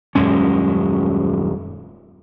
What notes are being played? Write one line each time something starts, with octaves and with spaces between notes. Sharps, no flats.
D#1 F#2 G#3 C#4